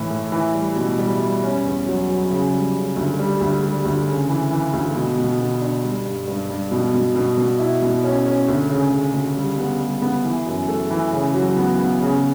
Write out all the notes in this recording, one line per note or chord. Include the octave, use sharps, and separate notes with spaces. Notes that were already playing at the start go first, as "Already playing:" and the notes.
Already playing: A2 E3
A2
E3
G3
B2
G3
G3
C#4
E2
F#3
F#3
C#3
G3
C#3
D2
G3
D2
G3
D2
C#3
E3
E3
D2
B2
B2
B2
D4
G3
G2
G2
G2
B2
B2
B2
B2
E4
B2
C#4
C#4
D2
C#3
C#3
D2
G3
B3
G3
B3
E3
F#2
A3
E3
C#3
F#3
B3
B3
C#3